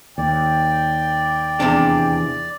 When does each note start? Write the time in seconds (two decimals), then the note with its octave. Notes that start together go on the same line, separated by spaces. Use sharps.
0.18 D#2 D5 G5
1.60 E2 C3 D4